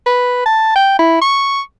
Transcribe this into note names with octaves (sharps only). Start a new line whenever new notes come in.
B4
A5
G5
E4
C#6